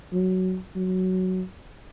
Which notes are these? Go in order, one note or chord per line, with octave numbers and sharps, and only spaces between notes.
F#3
F#3